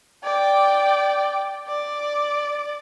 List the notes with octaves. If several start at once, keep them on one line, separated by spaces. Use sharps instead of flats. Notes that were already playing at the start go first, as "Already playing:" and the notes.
D5 G5
D5